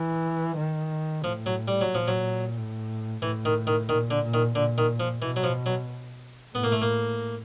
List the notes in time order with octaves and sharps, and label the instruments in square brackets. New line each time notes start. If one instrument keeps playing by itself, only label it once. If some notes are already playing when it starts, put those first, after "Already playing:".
Already playing: [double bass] E3
D#3
[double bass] A2 [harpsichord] F3
[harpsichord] F#3
G3
F#3
[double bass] A#2 [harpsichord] F3
[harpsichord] F#3
[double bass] A2
[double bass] A2 [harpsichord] E3
[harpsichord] D#3
D#3
[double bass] A#2 [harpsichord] D#3
[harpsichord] D3
[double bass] A#2
[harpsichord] D#3
[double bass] A#2 [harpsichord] D3
[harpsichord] D#3
F3
[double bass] B2 [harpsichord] E3
[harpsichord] F#3
F3
F#3
[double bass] A2 [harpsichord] B3
[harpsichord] A#3
A3
A#3